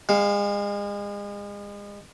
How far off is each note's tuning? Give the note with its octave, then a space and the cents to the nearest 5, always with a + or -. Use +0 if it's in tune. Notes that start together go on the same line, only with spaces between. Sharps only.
G#3 -35 F5 +0